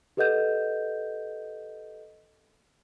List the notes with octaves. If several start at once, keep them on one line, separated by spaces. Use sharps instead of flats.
G4 A4 B4 D#5 F#5 G6